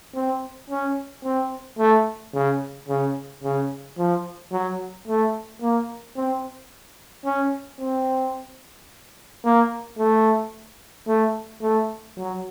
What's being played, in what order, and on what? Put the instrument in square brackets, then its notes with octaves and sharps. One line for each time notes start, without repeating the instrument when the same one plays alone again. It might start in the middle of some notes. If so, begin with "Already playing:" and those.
[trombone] C4
C#4
C4
A3
C#3
C#3
C#3
F3
F#3
A3
A#3
C4
C#4
C4
A#3
A3
A3
A3
F#3